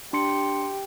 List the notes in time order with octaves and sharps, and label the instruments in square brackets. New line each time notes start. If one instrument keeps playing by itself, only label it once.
[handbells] D4 C6 C#7 [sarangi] G4